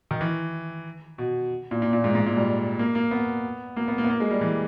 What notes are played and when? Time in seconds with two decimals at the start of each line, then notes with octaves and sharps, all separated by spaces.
0.11 D#3
0.21 E3
1.18 B2
1.71 A#2
1.82 A#2
1.93 A#2
2.04 G#2
2.15 G#2
2.26 A#2
2.37 G3
2.79 A#3
2.95 A#3
3.11 B3
3.76 A#3
3.88 B3
3.98 A#3
4.04 B3
4.09 A#3
4.20 G#3
4.30 G3
4.41 E3